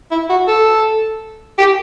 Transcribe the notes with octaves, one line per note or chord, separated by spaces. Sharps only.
E4
F#4
A4
G4